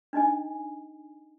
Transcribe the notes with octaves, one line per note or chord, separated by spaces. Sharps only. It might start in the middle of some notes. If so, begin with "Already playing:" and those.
D4 D#4 D#5 G#5